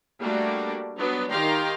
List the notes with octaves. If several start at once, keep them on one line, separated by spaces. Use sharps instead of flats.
G3 A3 A#3 D4 F#4
F#3 B3 D4
D#3 G4 F5 G5 A#5 C6